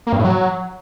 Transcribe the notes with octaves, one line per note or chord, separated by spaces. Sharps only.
A#3
G2
A2
F#3